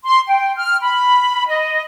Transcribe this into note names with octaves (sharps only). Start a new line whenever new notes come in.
C6
G5
F6
B5
D#5